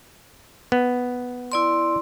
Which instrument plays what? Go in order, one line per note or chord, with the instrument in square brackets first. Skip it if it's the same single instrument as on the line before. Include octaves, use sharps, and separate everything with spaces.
[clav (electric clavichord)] B3
[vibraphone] E4 D5 C6